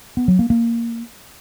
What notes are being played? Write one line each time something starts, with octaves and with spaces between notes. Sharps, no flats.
B3
F#3
A#3
A#3